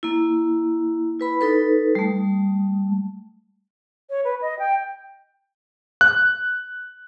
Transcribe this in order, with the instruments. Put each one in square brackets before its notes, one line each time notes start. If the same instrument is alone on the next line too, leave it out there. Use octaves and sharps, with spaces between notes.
[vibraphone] A#3 E4
E4 B4 B5
D#4 A4 B4
G3 A3
[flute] C#5
B4
D#5
G5
[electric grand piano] F#6